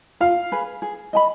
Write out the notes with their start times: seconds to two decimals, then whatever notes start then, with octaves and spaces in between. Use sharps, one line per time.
0.20 F4 F5
0.52 G#4 B4
0.82 G#4
1.13 D#5 G#5 B5